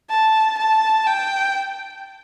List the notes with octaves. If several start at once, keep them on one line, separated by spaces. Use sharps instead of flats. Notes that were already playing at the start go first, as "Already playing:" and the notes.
A5
A5
G5